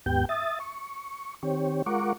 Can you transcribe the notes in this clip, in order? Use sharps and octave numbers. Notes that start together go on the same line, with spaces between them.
D#2 G#2 B3 G4 G5 G6
E5 D#6 A6
C#6
D#3 C4 G4 C#5
G#3 F4 A#4 F#5 C#6 D6